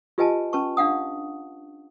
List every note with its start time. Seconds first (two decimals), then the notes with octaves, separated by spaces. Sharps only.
0.18 F4 G4 B4 D#5 G#5 A5
0.53 C#4 B4 A5 C#6
0.77 D4 F5 F#5 D#6